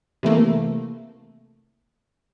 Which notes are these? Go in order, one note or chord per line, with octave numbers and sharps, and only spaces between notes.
C3 E3 A3 A#3